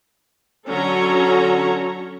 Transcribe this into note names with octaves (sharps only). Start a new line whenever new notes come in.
D3 F#3 C#4 A4 C#5 A#5